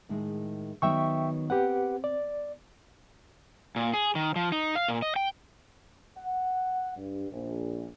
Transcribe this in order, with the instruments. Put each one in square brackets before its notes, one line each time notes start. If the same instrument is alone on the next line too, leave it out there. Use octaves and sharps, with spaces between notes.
[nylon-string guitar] A2 D#3 G#3
[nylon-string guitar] D#3 F#3 B3 [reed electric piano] E5 G5 C#6
[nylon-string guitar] C4 [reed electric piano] G4 B4 F#5
[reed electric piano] D5
[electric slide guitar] A#2
G#4
D#3
F3
D#4
F5
A#2
D#5
G5
[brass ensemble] F#5
G2
A#1